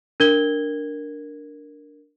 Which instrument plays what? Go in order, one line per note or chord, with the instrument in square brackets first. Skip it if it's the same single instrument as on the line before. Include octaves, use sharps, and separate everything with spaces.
[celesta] D4 A#4 G#6 G7